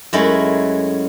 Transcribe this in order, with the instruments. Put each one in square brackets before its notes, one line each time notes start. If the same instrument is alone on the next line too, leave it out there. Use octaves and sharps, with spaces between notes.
[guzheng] F#2 F#3 G#3 A3 E4